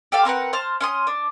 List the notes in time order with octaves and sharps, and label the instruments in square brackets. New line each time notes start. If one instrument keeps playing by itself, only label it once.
[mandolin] G4 A4 F5
C4 A#4 B4 F#5
C5 A5 F6
C#4 C6 D#6
D4